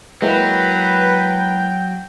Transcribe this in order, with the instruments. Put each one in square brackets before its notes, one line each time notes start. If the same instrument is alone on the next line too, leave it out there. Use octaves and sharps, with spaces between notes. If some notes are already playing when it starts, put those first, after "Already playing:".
[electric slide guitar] F#3 [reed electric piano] G#3 A#3 E4 [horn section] B4 [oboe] G5